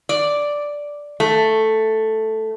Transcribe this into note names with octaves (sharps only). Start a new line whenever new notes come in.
D5
A3